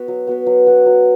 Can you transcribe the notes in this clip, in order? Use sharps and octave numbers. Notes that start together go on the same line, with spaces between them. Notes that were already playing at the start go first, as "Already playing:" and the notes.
Already playing: B3 F#4 B4
F#3
B3 F#4 B4
F#3
B3 F#4 B4
F#3